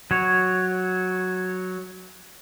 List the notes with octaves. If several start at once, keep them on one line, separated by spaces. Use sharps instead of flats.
F#3 C#5